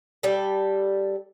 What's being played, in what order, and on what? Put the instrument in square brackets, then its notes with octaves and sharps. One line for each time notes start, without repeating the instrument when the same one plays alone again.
[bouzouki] G3 A4